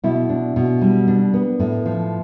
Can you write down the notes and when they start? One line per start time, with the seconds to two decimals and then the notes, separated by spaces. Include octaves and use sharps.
0.04 B2 E4
0.29 D4
0.56 B2
0.81 G3
1.08 D4
1.34 B3
1.59 A2
1.86 F3